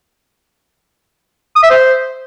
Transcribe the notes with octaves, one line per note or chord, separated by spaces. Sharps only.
D#6
E5
C5